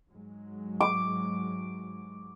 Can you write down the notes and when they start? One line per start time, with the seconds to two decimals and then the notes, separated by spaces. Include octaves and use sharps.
0.11 G#2 F#3 G#3
0.80 D6